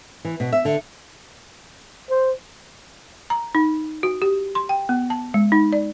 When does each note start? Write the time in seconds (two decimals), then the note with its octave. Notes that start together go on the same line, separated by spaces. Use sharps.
0.25 E3
0.40 B2
0.52 E5
0.65 D3
2.10 C5
3.30 A#5
3.55 D#4
4.03 F#4
4.22 G4
4.55 C6
4.69 G5
4.89 B3
5.10 A5
5.34 G#3
5.52 D#4
5.73 D5